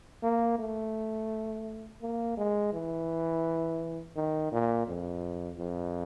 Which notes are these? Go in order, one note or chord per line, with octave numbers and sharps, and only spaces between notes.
A#3
A3
A#3
G#3
E3
D#3
A#2
F2
F2